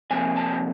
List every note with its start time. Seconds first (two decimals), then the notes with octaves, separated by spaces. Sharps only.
0.11 C3 F3 A#3 G#5
0.36 A5